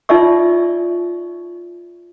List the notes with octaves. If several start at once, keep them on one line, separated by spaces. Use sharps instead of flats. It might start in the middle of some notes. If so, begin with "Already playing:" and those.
D#4 F4 D5 E5 C#6